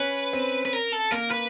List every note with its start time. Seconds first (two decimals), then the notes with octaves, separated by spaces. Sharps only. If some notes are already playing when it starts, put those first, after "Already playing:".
Already playing: C#4 B4
0.33 C4
0.65 B4
0.73 A#4
0.93 A4
1.12 A#3 A#4
1.31 B4